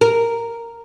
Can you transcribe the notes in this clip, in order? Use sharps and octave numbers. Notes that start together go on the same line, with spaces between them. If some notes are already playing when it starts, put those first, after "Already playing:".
A#4